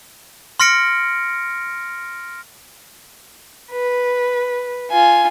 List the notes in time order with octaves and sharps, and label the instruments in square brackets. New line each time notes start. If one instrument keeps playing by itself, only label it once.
[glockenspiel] C6 F6 A#6 C#7 D7
[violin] B4
F4 G#5